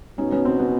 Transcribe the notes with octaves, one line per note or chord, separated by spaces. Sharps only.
B2 C#4 D#4
B3 C#4
C4
B3